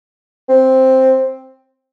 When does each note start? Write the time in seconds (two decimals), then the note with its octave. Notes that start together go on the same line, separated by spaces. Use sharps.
0.49 C4